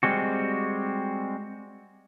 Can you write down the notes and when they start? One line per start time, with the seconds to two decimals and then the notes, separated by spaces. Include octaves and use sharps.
0.03 G3 G#3 C4 F#4